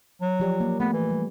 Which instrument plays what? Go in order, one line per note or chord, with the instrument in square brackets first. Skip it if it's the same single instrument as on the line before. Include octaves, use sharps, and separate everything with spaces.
[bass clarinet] F#3
[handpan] F3 G4 D5
A#3
[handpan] A3 [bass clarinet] B3
[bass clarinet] E3
[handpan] G3 G#3